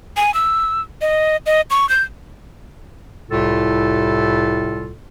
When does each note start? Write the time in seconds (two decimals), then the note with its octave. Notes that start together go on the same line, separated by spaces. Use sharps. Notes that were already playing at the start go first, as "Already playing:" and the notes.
0.17 G#5
0.34 E6
1.01 D#5
1.46 D#5
1.70 C#6
1.89 G6
3.30 C2 A2 C3 F4 A4